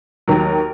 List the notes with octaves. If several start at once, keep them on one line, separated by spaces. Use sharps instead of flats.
D#2 D#3 F#3 A#4